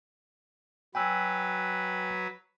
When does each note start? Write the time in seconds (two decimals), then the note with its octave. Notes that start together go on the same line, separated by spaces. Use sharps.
0.95 F#3 B4 G5 G#5 E6